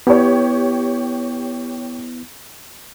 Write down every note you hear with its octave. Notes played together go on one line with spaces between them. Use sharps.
B3 E4 G4 C#5